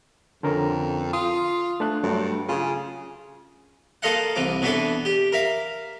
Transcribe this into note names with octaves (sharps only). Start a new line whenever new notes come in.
F2 D3 C#4 A#4
F4 D#6
A3 D4 F#6
G2 F#3 A3
C#3 F4 G#4
A#3 F4 A4 D#5 F5 F#5
C2 E3 D6
B2 E3 B3 D4 A4
G4
A#4 E5 F5